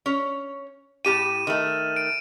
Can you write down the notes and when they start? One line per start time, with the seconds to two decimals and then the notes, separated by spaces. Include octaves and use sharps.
0.06 C#4 C#5
1.05 A2 G4 G5 D#7 E7
1.47 D#3 A3
1.96 D7